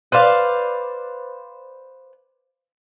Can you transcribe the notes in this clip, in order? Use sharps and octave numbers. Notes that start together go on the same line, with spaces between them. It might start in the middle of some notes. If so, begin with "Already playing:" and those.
B4 C5 D5 F5